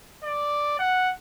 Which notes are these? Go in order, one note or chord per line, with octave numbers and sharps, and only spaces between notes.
D5
F#5